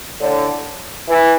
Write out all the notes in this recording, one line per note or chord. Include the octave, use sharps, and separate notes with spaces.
A2 D3
E3